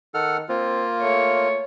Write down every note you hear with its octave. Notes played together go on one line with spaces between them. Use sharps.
D#3 A4 F#5 F6
A#3 C4 F4
A3 C#5